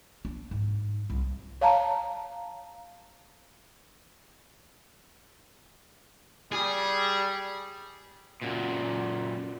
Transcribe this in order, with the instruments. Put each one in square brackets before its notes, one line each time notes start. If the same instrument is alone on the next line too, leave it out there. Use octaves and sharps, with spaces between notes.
[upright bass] D4
G#2
C2
[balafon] C#5 F5 A5 A#5
[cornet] G3 [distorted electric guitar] G#4
[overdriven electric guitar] F#2 A#2